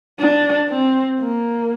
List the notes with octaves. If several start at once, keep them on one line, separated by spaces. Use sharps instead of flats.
D4
C4
A#3